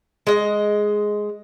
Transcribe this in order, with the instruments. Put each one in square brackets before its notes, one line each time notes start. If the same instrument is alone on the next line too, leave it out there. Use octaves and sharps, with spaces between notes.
[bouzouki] G#3 D#5